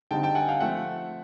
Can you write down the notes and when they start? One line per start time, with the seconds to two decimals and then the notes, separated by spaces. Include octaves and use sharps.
0.11 D3 G3 C4 D#4 G5 A5
0.23 G5 A5
0.35 F#5 G#5
0.48 F5 G5
0.60 F3 A3 C4 E5 F#5